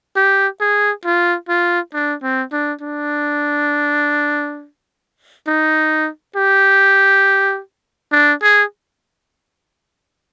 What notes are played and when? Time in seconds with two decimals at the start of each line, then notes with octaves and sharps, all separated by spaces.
0.16 G4
0.61 G#4
1.05 F4
1.49 F4
1.94 D4
2.23 C4
2.52 D4
2.81 D4
5.47 D#4
6.36 G4
8.12 D4
8.42 G#4